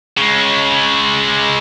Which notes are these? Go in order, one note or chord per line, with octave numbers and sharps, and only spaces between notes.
C#3 G#3